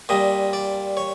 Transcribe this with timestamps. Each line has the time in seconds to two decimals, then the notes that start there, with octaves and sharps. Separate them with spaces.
0.09 A#2 G3 D#5
0.53 D5
0.97 C#5